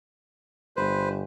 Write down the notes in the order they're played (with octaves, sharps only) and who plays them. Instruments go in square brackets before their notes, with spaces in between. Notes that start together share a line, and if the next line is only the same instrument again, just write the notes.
[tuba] G1 [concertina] B4 C5